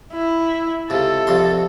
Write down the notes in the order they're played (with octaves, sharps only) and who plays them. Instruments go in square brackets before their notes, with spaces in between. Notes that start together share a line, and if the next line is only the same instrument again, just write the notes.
[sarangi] E4
[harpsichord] C#2 C3 [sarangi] A4
[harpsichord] C2 F2 C6